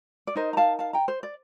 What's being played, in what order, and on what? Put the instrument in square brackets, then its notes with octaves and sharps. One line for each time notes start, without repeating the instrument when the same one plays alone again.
[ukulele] D5
D#4 A#4 C5 D#5
A#5
F5 A5
F5 A5
G5 A#5
C5
D5